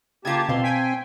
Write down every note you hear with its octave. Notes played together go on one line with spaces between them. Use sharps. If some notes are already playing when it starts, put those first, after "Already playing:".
C#3 A#3 F4 G4 A5 G#6
B2 C4 F5 A5 C6
G5 G#5 G#6 B6